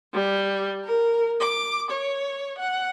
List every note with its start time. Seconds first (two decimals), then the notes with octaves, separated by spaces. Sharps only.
0.14 G3
0.85 A#4
1.41 D6
1.91 C#5
2.58 F#5